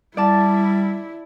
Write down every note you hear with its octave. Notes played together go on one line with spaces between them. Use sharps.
G3 E4 D5 A5